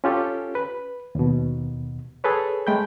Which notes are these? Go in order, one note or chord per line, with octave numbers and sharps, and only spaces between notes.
C#4 F4 G4 A4
B4
D#2 B2
G#4 A4 B4 C#5
G#3 A3 G5 B5 G6